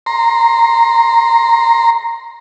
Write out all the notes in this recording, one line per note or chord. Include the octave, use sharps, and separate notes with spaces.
A#5 C6